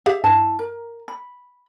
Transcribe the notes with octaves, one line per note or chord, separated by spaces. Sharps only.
G4 G#4 E5 F5
G2 E4 A5
A#4
B5